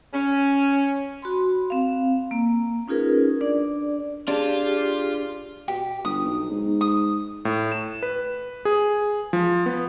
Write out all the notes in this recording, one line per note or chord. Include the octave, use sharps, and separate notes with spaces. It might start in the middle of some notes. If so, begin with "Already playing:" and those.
C#4
F#4 B5 C6
C4 F5
A#3
C#4 D#4 F4 G#4 A#4 B4
D4 D5
D4 F4 G4 G#4
B2 G4
G1 D#6
B1
G#2
D#6
A2
E7
B4
G#4
F3
B3